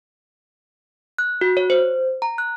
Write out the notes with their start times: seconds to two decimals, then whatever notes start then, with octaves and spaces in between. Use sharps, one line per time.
1.18 F#6
1.41 F#4
1.57 C#5
1.70 C5
2.22 A#5
2.38 F#6